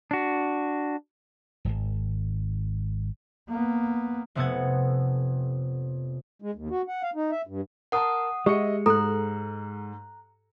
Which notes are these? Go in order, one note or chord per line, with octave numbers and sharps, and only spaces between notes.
D4 F#4
D1 G#1
A#3 B3
F1 C3 B3 A4 F#5 G#6
G#3
D#2
F#4
F#5
F5
D#4
E5
G2
A#4 F#5 A5 D#6
G#3 G4 D#5 E5 C#7
G#2 A4 A#5 F#6